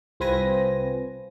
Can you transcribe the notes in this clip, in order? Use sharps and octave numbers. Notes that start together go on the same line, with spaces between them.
C2 C4 F4 B4 G#5 A#6